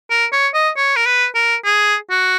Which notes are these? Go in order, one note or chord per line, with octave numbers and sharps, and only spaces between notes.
A#4
C#5
D#5
C#5
A#4
B4
A#4
G#4
F#4